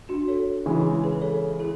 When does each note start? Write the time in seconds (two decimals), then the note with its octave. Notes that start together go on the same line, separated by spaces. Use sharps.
0.09 D4 F#4
0.28 A4 C#5
0.66 C#3 E3 G#3
1.04 G#4 B4
1.22 A4 C#5
1.60 E4 G#4